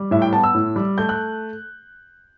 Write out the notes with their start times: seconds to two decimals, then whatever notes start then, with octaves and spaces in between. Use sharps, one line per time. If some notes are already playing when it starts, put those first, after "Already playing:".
Already playing: G3
0.11 A2 E5
0.22 G5
0.33 B3 A5
0.44 E6
0.54 A2
0.76 G3
0.98 A3 G6
1.09 F#6